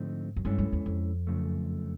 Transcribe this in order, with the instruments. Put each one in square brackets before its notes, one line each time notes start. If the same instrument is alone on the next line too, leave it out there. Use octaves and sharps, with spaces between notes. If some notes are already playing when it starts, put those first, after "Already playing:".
Already playing: [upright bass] G#2 [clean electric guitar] D3 F3 A3 C4 D#4
[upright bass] F#2
[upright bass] G2 [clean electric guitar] G#3 C#4 E4 A4 C#5
[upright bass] F#2
E2
F2
[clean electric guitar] F#2 C#3 F3 A3